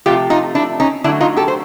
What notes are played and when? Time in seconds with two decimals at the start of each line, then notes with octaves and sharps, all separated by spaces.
0.06 C3 F3 A3 F4 G4
0.30 D#4 F4
0.55 D4 E4
0.80 C#4 D#4
1.04 D3 F#3 A3 D4 E4
1.20 D#4 F4
1.36 G4 A4
1.48 C5